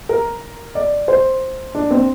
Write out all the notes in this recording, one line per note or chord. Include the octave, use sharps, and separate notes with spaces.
A#4
D5
C5
D4
C4